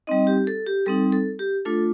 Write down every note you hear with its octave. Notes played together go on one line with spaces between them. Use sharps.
G3 C4 D#4 D#5
G4
A4
G4
G3 C4 D#4 A4
A4
G4
A3 D4 F4 A4